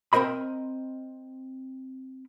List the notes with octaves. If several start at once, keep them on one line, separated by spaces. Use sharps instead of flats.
C4 A#4 C5 D#5 B5